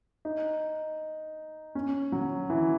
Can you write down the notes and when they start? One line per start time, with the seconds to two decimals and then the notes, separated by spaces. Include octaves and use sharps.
0.25 D#4
1.75 C#4
2.12 F#3
2.50 E3